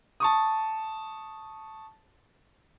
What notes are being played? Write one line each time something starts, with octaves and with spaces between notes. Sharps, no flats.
A5 C#6 D#6